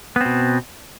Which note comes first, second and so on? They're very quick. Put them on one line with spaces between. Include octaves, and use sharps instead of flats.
B3 C4 B2